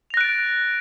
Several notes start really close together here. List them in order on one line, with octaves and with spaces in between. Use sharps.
F7 A#6 F#6 D7 A6